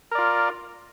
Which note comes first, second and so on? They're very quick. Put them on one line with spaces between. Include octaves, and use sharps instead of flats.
A#4 D5 F4